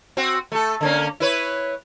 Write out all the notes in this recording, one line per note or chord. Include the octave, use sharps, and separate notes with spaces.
C4 F#4
A3 A4
D3 A#3 C#4
E4 B4 C#5